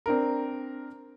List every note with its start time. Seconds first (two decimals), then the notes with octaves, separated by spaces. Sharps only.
0.06 C4 D4 A#4